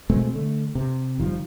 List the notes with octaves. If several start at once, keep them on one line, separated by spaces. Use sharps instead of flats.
B2 G#3 A3 C4
D3 A3
C3
F#1 D#3 F3 G3